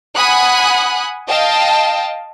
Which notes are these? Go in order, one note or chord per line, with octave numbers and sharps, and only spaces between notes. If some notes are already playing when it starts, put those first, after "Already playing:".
F#5 G#5 B5 D#6 F#6
D#5 F5 G5 A5